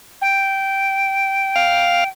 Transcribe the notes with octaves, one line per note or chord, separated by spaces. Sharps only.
G5
F5